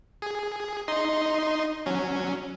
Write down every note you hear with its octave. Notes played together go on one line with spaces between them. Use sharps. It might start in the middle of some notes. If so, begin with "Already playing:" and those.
G#4
D#4 D#5 C6
F#3 C#4